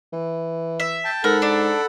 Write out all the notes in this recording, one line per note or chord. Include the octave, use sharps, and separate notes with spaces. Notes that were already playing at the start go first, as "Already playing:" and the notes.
E3
E5
G5 A5
G#2 A4 A#4 F#5 B5
D4